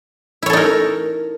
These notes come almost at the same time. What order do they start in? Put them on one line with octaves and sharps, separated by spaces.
E4 C#5 A4 D#4 A#4